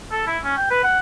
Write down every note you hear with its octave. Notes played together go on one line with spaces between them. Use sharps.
A4
E4
C#4
G5
B4
F#5